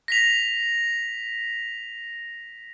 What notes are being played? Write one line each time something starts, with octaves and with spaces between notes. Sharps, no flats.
A#6 B6 F7